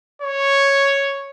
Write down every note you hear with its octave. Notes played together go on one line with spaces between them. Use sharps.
C#5